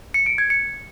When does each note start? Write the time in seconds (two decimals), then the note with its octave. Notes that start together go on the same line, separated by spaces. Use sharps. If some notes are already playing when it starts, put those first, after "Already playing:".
0.14 C#7
0.26 D7
0.38 G#6
0.50 C#7